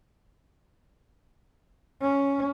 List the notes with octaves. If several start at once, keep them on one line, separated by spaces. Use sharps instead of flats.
C#4